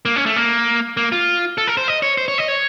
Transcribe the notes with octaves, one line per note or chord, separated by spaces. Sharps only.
A#3
C#4
A3
A#3
A#3
F4
A4
A#4
C5
D#5
C#5
C5
C#5
D#5
C#5